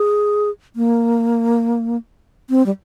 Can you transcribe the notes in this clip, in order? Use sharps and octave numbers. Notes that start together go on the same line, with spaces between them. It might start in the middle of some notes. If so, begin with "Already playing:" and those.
Already playing: G#4
A#3
C4
G3